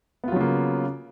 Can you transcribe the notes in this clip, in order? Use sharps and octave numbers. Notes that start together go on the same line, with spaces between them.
C#3 F#3 A#3 B3 F4